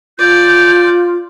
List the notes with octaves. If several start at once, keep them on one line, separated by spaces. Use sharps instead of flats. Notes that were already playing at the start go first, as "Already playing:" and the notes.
F4 D5 G6